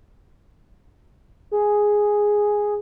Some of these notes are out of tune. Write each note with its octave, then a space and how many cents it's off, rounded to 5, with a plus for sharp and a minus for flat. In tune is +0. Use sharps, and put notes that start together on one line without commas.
G#4 +0